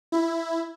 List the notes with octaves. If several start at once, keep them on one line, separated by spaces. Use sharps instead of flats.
E4